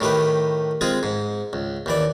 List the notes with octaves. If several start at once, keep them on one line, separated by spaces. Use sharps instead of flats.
A2 D#3 G4 B4
G#3 C4 F4 G#4
G#2
C#2
D#2 E3 D5